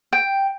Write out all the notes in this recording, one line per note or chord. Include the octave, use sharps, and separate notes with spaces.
G5